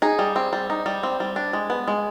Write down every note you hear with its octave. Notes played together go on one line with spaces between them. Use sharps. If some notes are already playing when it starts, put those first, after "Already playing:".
D#4 G#4
G3
C4
G3
D#4
G3
C4
G3
D4
G#3
B3
G#3